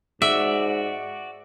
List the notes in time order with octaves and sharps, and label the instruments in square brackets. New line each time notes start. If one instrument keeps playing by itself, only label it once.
[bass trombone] G#2 [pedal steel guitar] F#4 D5 [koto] E5